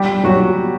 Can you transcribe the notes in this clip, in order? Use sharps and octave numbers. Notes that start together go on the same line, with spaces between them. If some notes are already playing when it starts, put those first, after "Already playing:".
Already playing: G3 G4
F#3 F#4